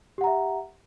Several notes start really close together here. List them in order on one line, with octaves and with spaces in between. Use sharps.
G4 F#5 A#5 E5